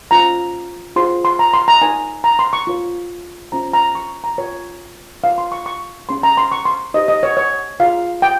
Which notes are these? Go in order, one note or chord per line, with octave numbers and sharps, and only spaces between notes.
C#4 F4 C5 A#5
F4 G#4 C5 C6
C6
A#5
C6
A#5
D#4 A#4 C#5 G#5
A#5
C6
C#6
F4 A#4 C#5
C#4 F4 C5 A#5
A#5
C#6
A#5
F4 A#4 C#5
F4 A#4 C#5 F5
C6
C#6
C#6
C#4 G#4 C#5 C6
A#5
C6
C#6
C6
D#4 G4 C5 D#5
D#5
C#5
C#5
F4 G#4 C#5 F5
G5